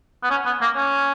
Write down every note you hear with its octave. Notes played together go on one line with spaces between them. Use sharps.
B3
C#4
B3
A#3
C#4